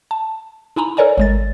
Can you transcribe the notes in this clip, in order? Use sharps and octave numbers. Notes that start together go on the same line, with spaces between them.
A5
D#4 E4 G#5 A#5 B5
A4 A#4 C#5 D5 G#5 A#5
G#1 G#3 A6